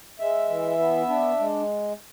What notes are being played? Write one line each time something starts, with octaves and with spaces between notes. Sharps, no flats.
G#3 E5
E3
B3
D4
G#3